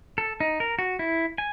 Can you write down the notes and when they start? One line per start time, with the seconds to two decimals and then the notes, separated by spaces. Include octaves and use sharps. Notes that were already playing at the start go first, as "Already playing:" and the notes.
0.18 A4
0.40 D#4
0.60 A#4
0.79 F#4
0.99 E4
1.38 G#5